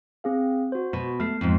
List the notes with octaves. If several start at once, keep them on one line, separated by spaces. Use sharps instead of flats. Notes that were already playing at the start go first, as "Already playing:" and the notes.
C4 G#4 F5
F#4 C5
B2
A3 F6 C7
F2 G#2